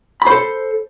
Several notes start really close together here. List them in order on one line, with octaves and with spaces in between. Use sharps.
B5 C5 A4